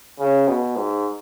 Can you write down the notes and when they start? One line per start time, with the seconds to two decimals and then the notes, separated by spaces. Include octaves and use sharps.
0.19 C#3
0.47 B2
0.76 G#2